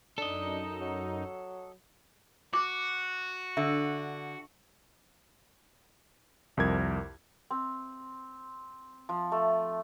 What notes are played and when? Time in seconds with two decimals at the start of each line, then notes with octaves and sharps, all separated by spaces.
0.18 F#2 D4 D#4 A4 D#5
0.82 F#3
2.54 F#4 D6
3.57 D3 E5
6.57 C2 F2 A#4 G#6
7.50 C4
9.09 F3
9.32 A3